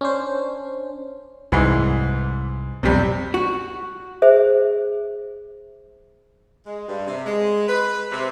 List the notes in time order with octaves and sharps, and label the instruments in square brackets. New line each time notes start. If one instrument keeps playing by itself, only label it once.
[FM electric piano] C#4 D4 C5
[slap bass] C2 [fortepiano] G#2 E3
[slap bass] B1 F2 A2 [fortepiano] C3 G3
[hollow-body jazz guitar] F#4
[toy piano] G#4 C5 E5
[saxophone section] G#3
G2
C3
G#3
B4
C3